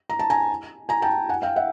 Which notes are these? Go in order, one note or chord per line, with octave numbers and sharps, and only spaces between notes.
A#5
A5
G#5 A#5
G#5 A#5
G5 A5
F#5 G#5
F5 G5
E5 F#5